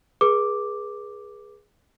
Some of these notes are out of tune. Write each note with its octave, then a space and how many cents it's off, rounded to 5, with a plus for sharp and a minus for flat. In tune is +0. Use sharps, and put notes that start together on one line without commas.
G#4 +0 B4 -35 D6 +0